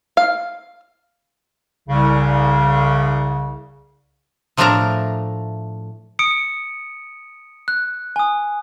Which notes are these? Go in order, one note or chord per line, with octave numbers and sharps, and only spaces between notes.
F5
C2 C#3
A2 F3 A3 D4 A#4 A#5
D#6 C#7 D7
F#6
G#5 D#6